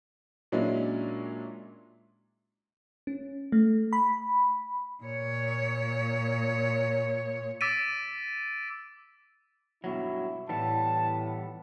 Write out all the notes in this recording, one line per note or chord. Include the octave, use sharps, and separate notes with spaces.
A#2 F#3 G#3 C#4 D4 E4
C#4
A3
B5
A#2 C#5
D6 E6 A6 B6 D7 D#7
G2 B2 F#3 E4
A2 E3 G3 B3 A5